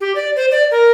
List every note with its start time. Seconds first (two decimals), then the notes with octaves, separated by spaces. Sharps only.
0.01 G4
0.15 D5
0.36 C5
0.51 D5
0.71 A#4